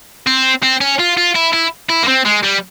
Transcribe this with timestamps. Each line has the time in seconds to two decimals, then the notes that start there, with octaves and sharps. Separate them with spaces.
0.27 C4
0.63 C4
0.81 C#4
0.99 F4
1.17 F4
1.36 E4
1.53 E4
1.89 E4
2.03 A#3
2.08 C4
2.26 G#3
2.44 G3